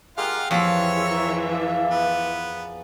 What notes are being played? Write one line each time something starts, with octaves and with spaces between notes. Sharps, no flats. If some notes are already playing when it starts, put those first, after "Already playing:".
G#3 F4 G4 A#4 F5 F#5
F2 E3 C4 C#5 E5 C#6 E6
G#3 A#4
D5 F5
B3